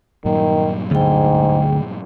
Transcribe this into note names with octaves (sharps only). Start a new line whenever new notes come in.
G2 A#2 D#3 F#3
D2 G#2 G#4 G5